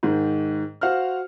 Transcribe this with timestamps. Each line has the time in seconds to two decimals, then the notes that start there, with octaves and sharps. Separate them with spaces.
0.03 G#2 D#3
0.81 F#4 C5 F5 F#5 F6